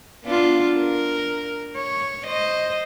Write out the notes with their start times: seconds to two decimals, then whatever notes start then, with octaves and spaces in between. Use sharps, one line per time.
0.25 B3 D4 F4
0.79 A#4
1.77 C#5
2.25 C5 D#5